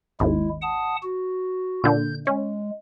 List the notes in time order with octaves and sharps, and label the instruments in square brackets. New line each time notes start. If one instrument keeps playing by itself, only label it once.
[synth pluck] G#1 D#2 [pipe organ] G#3 E4
[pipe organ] F#5 A5 D#6
F#4
[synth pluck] A#2 D3 [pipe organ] G6
[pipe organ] G#3 [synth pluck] C#4